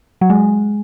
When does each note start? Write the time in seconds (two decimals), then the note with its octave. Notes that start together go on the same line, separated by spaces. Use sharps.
0.21 F#3
0.30 G#3